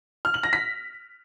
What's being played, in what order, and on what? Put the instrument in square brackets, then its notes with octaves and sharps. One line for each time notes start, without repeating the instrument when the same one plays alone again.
[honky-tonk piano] F6
F#7
A#6
B6